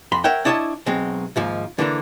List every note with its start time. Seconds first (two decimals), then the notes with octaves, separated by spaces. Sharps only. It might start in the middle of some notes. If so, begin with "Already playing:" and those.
0.12 F2 B5 C6
0.24 A#4 C#5 E5 F#5 G5
0.45 D4 E4 C#5 D#5 E5 A5
0.86 B1 F#3 G#3 C4
1.36 D#2 G#2 F3
1.79 D3 E3 A#3 D4